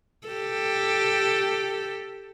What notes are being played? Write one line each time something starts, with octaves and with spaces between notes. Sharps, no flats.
G4 A4